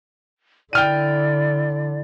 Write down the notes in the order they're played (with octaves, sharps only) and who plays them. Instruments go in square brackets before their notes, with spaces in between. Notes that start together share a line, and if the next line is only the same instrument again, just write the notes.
[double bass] D3 [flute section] E4 D5 [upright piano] G5 F6 D#7